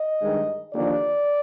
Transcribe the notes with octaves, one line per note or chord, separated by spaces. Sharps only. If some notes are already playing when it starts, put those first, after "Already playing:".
Already playing: D#5
G2 D#3 G#3
D#2 D3 F3 A#3 D5